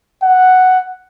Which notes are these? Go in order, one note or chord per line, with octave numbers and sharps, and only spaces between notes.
F#5